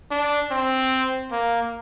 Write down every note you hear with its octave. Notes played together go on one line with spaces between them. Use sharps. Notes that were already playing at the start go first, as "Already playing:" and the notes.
D4
C4
A#3